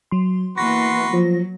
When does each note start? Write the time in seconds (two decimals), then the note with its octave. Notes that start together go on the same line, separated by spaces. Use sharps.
0.11 F#3 C6
0.58 E3 A#3 B3 F#4 B4 C6 A#6
1.13 F3 F#3